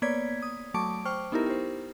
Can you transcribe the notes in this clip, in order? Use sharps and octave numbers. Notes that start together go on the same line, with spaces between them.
A#3 B3 C#5 D5 G#6 B6
D#6
F#3 A3 A5 C#6 D6 D7
C5 G5 C#6 F6
B3 D#4 E4 G4 A#4
G4 C5